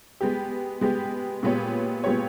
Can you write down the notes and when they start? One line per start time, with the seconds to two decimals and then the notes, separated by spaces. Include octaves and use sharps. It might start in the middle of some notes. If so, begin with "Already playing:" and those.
0.21 G#3 B3 G4
0.81 G#3 B3 G4
1.43 A#2 G#3 B3 G4 C#5
2.04 A#2 G#3 B3 G4 C#5